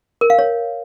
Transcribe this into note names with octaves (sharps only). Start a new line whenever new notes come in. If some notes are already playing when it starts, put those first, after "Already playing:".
A#4
F5
C#5